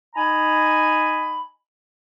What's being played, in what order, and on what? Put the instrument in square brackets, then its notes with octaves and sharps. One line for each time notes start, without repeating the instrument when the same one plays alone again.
[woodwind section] D#4 G#5 A#5 B5